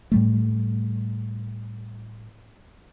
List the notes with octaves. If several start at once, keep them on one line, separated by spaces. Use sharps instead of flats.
A2 G3 A3